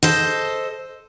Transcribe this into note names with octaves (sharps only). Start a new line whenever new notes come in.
A4 C5 D#5